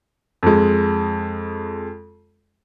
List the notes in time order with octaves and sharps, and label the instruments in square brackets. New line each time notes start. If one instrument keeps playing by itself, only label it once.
[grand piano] F2 G#3